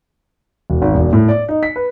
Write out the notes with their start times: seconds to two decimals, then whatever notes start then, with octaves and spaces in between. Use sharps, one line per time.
0.70 E1
0.82 G#1
0.94 E1
1.13 A2
1.28 D5
1.49 D#4
1.63 B6
1.76 B4